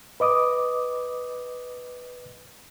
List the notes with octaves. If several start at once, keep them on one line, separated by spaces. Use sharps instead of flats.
B4 D#5 D6 D#6